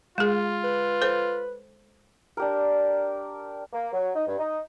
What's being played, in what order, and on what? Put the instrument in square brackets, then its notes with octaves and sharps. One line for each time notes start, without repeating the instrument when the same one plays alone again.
[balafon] G#3 G#4 [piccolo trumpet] F4
[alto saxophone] B4
[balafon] A4 C5
[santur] D4 G4 A#4
[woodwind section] A#3
F#3
D#4
G2
D#4